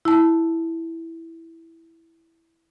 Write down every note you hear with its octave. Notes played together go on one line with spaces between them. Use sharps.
E4 A5